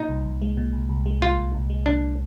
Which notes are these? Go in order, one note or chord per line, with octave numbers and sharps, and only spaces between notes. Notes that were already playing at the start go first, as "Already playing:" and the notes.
Already playing: A#2 D#4
C2
C2
G#3
A#2
C2
C2
G#3
A#2 F4
C2
C2
G#3
A#2 D4